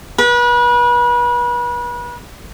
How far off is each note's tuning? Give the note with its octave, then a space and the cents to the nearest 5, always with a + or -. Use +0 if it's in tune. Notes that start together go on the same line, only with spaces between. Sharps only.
B4 -35